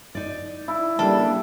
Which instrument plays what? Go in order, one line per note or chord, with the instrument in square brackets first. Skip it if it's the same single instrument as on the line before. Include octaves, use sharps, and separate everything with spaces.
[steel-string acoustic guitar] D#4 D5
[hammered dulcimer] E4
[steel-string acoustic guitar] C#3 A#3 D4 [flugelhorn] G3 [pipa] A4